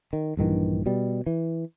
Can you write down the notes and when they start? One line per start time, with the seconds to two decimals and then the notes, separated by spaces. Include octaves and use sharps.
0.13 D#3
0.37 A#1 G2 D#3 E3
0.86 B2 G3
1.26 E3